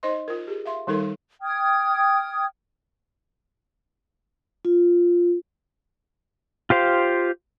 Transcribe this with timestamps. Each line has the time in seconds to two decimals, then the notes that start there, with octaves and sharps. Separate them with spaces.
0.03 D#4 C5 D#5 C6
0.28 F4 A#4
0.47 G4 G#4
0.65 E5 F5 C6
0.87 D#3 G3 D#4 A4 A#4 C6
1.42 G5 D#6 F6 G#6
4.65 F4
6.70 F4 G4 C5 F5